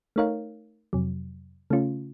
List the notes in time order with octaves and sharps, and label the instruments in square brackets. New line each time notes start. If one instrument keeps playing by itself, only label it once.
[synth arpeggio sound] A3 D#4 A#4 C#5 F5
F2 C3 F#3
C#3 A3 C#4 F4